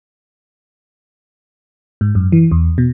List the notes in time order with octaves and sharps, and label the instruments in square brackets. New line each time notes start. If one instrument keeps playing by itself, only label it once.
[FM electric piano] G#2
F#2
E3
E2
B2